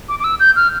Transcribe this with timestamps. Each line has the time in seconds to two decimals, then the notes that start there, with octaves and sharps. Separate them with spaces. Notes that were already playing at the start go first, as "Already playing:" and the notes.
0.09 D6
0.20 D6
0.24 E6
0.40 G6
0.56 F6